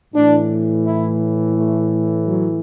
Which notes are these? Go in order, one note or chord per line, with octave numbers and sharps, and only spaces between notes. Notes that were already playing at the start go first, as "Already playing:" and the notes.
A2 E3 D4
E4
A3
F#3